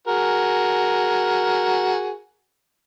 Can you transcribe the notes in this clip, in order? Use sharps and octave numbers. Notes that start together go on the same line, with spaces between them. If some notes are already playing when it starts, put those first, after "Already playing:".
F#4 G#4 A#4